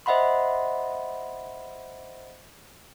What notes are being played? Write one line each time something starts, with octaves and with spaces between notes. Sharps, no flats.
C5 D#5 E5 F#5 B5 C6